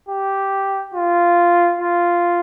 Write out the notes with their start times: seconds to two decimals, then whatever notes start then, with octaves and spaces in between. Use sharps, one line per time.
0.09 G4
0.94 F4
1.80 F4